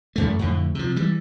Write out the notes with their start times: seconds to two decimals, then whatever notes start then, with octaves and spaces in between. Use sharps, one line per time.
0.16 A1 F#2 A3
0.39 F2 A2 D3
0.75 C3 F3
0.96 E3 G3